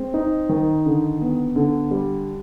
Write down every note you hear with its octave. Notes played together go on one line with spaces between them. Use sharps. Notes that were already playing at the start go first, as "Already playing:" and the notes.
Already playing: G#3 C4
D#4
D#3
D3
B3
D3
G3